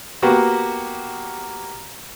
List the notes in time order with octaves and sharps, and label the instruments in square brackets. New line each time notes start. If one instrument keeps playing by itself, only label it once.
[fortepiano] A#3 B3 F#4 G4